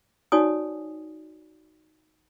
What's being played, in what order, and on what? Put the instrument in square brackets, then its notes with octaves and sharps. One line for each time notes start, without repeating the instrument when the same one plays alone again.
[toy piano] D#4 F#4 C#5 D5 G#5 D#6